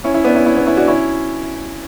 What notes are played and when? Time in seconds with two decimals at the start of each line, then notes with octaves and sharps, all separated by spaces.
0.04 C#4 E4
0.14 C#4 E4
0.24 B3 D4
0.35 C#4 E4
0.46 C#4 E4
0.56 B3 D4
0.66 C#4 E4
0.77 D4 F#4
0.88 C#4 E4